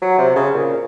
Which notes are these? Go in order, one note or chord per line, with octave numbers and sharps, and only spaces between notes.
F#3
C3
C#3
A#2